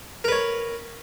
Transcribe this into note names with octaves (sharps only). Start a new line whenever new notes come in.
A#4 B4 C#5